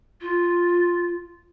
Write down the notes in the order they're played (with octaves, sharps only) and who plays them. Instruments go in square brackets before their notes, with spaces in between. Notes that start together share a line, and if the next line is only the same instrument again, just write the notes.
[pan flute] F4